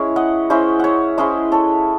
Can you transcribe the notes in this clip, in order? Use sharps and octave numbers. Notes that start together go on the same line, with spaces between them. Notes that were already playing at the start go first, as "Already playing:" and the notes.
Already playing: G#3 C#4 E4 C#5
D#5 F#5
G#3 C#4 E4 C5 D#5
C#5 E5 F#5
G#3 C#4 E4 C5 D#5
A4 C#5